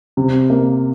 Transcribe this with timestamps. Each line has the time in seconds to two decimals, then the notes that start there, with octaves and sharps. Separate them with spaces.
0.17 C3
0.50 A#3